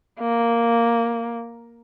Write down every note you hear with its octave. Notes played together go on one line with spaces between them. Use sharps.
A#3